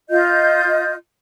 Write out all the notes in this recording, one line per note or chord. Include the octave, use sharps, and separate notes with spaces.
F4 D#5 G6